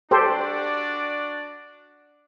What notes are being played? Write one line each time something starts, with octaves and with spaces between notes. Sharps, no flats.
D4 F#4 G4 A4 C5 D5